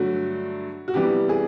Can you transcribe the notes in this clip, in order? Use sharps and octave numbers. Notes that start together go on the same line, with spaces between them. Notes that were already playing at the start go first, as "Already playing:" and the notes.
Already playing: G2 D3 F#3 A3 F#4
F#4
C3 E3 G3 B3 G4
G#4